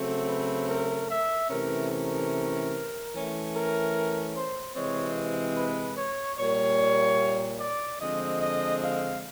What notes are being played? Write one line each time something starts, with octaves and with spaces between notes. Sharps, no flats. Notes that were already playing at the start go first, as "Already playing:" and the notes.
Already playing: C#3 F#3 A3 C4
B4
A#4
E5
C3 E3 A3 C#4 A#4
A#4
E3 A3 C#4
A#4
C5
C3 E3 G#3 C4 C#5
B4
C#5
A#2 G3 A#3 C#5
D5
D3 F3 G#3 C4 D#5
D#5
F5